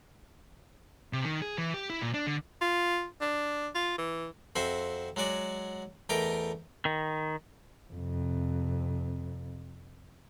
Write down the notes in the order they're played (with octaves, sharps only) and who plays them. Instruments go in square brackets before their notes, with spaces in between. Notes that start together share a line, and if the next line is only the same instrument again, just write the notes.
[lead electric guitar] C3
D#3
G#4
E3
G4
E4
A#2
D4
D3
[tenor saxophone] F4
D4
F4
E3
[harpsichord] F2 C4 F#4 C5 E5
F#3 G#3 F#4 D5
E2 A3 A#4 D#5 G5 D6
[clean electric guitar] D#3
[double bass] F2 C3